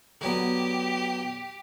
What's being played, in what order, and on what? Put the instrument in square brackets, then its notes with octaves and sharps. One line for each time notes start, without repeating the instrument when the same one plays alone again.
[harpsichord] D3 F#3 B3 [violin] G4